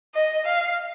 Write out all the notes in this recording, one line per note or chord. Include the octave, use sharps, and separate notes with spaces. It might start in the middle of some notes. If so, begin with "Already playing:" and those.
D#5
F5